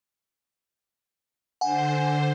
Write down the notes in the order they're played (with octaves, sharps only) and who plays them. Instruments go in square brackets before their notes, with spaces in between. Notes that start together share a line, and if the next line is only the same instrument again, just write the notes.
[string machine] D3 C5 [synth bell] F#5 G#5